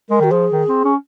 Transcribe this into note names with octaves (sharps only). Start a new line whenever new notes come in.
G#3 A#4
D#3 F#4
F3 G#4
D#3
C4
C#4